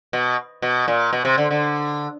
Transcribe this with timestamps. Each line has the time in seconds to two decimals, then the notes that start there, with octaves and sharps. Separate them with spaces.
0.13 B2
0.62 B2
0.88 A#2
1.13 B2
1.25 C3
1.38 D3
1.51 D3